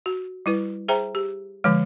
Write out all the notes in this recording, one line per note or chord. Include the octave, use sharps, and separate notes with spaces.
F#4
G3 E4 B4
G#4 C5 E5 G5 A#5
G4
D3 F3 G#3